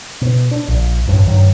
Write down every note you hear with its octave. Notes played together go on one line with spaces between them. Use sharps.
B2
D4
A#1
A1 G2
G2 D#3 F#3